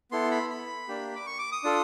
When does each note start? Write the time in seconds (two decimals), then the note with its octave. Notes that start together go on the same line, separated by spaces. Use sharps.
0.11 B3 E4 A4 C6
0.31 B5
0.50 B5
0.88 A#3 D4 G4
1.16 D6
1.27 C#6
1.39 D6
1.52 D#6
1.64 D4 F4 A4